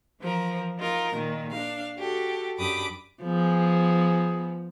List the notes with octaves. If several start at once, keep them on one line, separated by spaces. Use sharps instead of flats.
E3 F3 A#4
D#4 F4 A#4
A#2 D#3
D4 F5
F#4 G4 A4
F#2 D4 G4 B5 D6 D#6
F3 B3 G#4